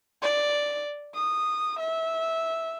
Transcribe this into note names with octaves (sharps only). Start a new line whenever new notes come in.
D5
D#6
E5